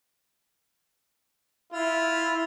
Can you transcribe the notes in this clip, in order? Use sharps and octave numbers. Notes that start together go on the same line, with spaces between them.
E4 F4